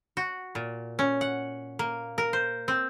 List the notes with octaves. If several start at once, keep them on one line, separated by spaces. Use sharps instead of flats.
F#4
A#2
C#4
F#5
A#3
A#4
C5
C4